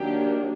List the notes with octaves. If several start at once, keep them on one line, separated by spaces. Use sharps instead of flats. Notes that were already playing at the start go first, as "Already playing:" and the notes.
Already playing: D#3 F#3 A#3 D4 G4